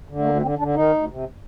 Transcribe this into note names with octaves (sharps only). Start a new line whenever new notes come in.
D3
A3
D2 A#3
D3 C4
D3 D4
D#3 D#4
D2
C3